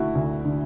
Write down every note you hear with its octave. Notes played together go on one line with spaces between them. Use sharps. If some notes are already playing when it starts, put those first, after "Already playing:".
Already playing: D3 A3 E4 F#4
D2
D3